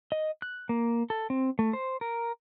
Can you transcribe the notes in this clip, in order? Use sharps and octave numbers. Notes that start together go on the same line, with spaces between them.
D#5
F#6
A#3
A4
C4
A3
C5
A#4